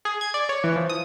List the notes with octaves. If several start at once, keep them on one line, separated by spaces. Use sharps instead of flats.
G#4
G#6
D5
C#5
E3
F3
D#6